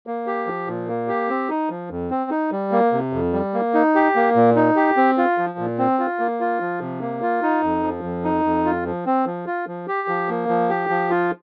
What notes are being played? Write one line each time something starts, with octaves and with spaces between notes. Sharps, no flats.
A#3
G4
F3
A#2
A#3
G4
C4
D#4
F3
F2
C4
D#4
G3
A#3
C3
F2
G3
A#3
D#4
G4
A#3
A#2
D#4
G4
C4
F4
F3
A#2
C4
F4
A#3
F4
F3
C3
A#3
F4
D#4
F2
F3
F2
D#4
F2
F4
F3
C4
F3
F4
F3
G4
F3
A#3
F3
G4
F3
F4